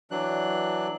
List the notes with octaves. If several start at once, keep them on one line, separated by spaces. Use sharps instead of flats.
E3 F#3 D4 F#6